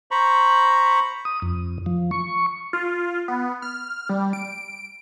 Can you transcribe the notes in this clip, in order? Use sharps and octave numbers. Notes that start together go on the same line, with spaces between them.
C5 A#5 B5 C#6
D#6
F2
F3
C#6
F4
B3
F6
G3
D7